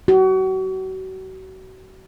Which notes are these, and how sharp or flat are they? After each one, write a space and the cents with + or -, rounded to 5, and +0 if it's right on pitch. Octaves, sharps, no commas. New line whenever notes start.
F#4 +35